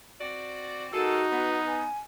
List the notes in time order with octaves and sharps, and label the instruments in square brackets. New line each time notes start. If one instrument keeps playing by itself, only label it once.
[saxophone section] C4 F#4 D5
[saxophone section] G#3 A#3 A4 [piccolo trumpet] D#4 [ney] F#4
[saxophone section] B3
[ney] G#5